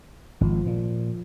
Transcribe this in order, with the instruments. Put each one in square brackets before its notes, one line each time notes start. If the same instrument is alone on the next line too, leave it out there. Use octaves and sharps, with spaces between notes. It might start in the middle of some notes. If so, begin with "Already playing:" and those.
[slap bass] G#1 [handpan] F3
[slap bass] A#2